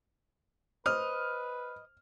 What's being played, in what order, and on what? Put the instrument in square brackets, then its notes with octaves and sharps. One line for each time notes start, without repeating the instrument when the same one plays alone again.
[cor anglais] B4 [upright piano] C5 [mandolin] D#5 [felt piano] F6